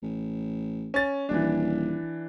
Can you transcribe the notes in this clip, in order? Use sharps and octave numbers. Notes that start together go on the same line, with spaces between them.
A1
C#4 A6
D#1 E3 D4